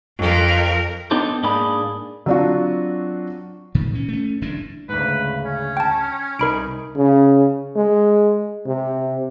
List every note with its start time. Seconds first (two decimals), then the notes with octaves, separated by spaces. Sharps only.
0.18 F2 A#4
1.11 B3 D4 D#4 G4 A4 C5
1.43 G#2 A#3 D4 G#4 B5
2.26 F#3 C4 D4 F4 F#4
3.75 A#2 D#3 F3
3.93 E3 C#4
4.08 A3 C#4
4.42 F#1 G2 E3 D4
4.89 D2 G#2 C#3 B4
5.46 C#4
5.77 G5 A5
6.39 C2 D#4 A#4 B5 D7
6.96 C#3
7.76 G#3
8.66 C3